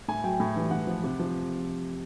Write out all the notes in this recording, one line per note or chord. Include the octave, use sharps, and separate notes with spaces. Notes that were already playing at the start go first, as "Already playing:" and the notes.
A2 G#5
F#3 G5
A2
E3 G3
A2 F#5
F3
C3
F3